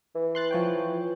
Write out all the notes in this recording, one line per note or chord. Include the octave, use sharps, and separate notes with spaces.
E3
C6 F#6 A6
F3 C#5 G5